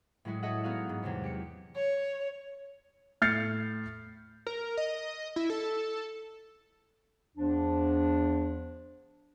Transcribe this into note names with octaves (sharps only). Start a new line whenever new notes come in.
A2 F#3 G#3 E4 F#4
F#4 A4 C#5 D#5 E5 F#5
B3 D#4 F#4 G#4 F5 F#5
G#2
E2 C3 F#3 B3
G4 C#7
C#5
A2 F6 G6 A6 C7 C#7
A#4
D#5
E4
A4
E2 F3 D4